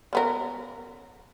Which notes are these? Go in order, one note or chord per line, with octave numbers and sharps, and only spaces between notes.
C#3 B3 A#4